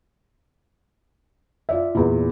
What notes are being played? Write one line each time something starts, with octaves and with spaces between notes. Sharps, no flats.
F4 D5 E5
E2 A#2